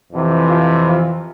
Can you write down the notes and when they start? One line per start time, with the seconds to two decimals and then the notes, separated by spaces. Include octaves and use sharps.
0.12 F2 C3 E3
0.49 F3 F4
0.87 F3 F4